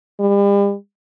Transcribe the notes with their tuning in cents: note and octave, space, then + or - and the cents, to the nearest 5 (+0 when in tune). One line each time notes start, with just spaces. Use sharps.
G3 +40